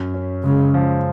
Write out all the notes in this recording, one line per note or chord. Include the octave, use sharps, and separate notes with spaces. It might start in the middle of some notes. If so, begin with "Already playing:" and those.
Already playing: F#2
C#4
C#3 G#3
F3